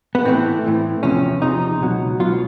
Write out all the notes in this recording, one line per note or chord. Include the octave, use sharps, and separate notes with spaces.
B3
A2 E3 A3 C4
A2 E3 A3
E2 C3 F3 C#4
E2 C3 F3 D#4
C#2 B2 F#3
C#2 B2 F#3 F4